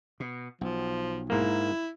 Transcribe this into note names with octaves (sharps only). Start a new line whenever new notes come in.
B2
B1 F3
G#2 A#3 E4